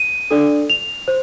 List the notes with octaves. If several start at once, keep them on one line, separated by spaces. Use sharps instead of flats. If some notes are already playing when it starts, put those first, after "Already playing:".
Already playing: D#7
D4 A4 D5
F7
C5